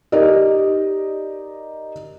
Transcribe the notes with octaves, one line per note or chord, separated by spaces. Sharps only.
D#4 G4 A#4 D5 D#5